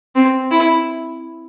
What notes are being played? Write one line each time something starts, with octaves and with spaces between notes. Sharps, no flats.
C4
E4